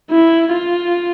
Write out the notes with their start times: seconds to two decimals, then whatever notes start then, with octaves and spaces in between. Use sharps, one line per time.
0.11 E4
0.53 F4